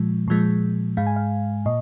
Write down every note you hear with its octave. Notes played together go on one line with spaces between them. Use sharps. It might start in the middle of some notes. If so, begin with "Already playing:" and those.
Already playing: A#2 F3 G#3
A#2 F3 G#3
G#2 G#3 F5
G#5
F5
A#2 D#5